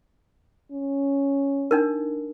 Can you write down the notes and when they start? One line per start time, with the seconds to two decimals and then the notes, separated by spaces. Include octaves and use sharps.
0.72 C#4
1.71 D4 D#4 A#4